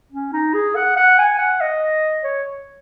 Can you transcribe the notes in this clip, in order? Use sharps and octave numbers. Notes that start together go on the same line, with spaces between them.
C#4
D#4
G#4
F#5
F#5
G#5
F#5
D#5
C#5